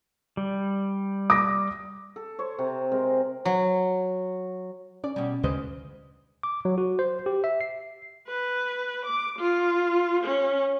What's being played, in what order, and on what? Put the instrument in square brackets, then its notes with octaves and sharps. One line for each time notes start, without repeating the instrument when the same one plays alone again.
[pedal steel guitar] G3
[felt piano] D6 D#6 A#6
[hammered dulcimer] A4
C5 C#5
C3 C4 A#5
G#3 C4 A#4
[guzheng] F#3
[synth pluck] C#4 [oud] D5
[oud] B2 G3
[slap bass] D2 C#3 G#3 [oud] B4 C5 D#5
[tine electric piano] D6
F#3
F#4
C5
G4
E5
C7
[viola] B4
D6
F4
C#4